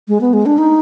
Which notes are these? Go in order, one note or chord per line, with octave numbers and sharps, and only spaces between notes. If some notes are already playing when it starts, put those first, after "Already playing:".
G#3
B3
G#3
D4
D#4